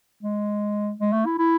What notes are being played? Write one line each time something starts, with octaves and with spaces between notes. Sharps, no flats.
G#3
G#3
A3
E4
E4